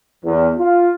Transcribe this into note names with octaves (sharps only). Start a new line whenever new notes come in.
E2
F4